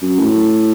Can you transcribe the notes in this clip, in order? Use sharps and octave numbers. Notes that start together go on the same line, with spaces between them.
F#2
A2